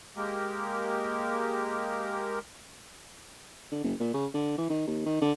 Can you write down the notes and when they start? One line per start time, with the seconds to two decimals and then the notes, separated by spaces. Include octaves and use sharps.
0.16 G#3 A#3 G4 A#4
3.72 D3
3.84 F#1
4.00 A#2
4.14 C#3
4.34 D3
4.58 E3
4.70 D#3
4.87 D#2
5.06 D#3
5.21 D3